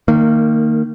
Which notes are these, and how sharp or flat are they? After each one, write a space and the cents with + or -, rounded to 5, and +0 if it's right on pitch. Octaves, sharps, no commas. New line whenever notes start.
D#3 -10 A#3 -30